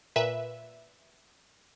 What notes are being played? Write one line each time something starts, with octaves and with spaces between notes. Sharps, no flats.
A#2 B4 E5